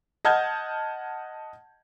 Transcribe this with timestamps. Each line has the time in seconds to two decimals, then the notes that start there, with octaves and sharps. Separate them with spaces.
0.25 D#5 F#5 A5 F6 G6 G#6